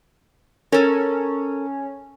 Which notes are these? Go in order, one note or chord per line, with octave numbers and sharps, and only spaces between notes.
C#4 A4 A#4